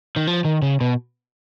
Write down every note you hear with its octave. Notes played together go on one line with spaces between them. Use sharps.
D#3
F3
D#3
C#3
B2